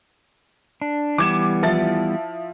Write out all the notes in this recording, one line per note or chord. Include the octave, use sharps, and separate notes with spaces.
D4
E3 G3 B3 D6 G#6 E7
F3 E4 A6